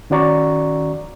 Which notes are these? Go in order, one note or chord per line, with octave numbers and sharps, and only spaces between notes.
D#3 C#4 F#4 D5 A#5 C#6